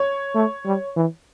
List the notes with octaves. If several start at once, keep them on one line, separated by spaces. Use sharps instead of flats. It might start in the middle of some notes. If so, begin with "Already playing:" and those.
Already playing: C#5
A3
G3
E3